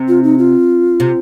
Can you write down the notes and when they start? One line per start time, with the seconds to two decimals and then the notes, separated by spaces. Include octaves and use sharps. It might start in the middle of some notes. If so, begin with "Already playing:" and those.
Already playing: C3
0.08 F4
0.23 D#4
0.39 F4
1.00 C3